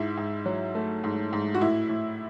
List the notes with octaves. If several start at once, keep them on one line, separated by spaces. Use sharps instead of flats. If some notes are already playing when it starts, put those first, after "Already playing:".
Already playing: G#2 E4
G#2
F#3
A3
G#2
G#2
F#4
A2 E4
A2